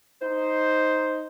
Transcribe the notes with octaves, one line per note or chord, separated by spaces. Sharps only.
D#4 C5